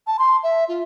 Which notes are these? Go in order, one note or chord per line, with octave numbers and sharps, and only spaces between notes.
A5
C6
E5
F4